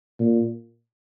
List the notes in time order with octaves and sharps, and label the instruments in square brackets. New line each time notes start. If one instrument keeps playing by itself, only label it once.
[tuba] A#2